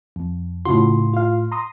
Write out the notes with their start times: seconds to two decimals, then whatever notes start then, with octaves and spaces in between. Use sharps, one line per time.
0.16 F2
0.65 A2 C#3 F4 F#4 C6
1.13 F4 F5
1.51 A#5 C6 D#6